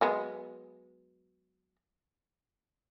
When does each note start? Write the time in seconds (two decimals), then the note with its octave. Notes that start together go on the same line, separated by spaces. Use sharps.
0.01 F#3 G#3 B3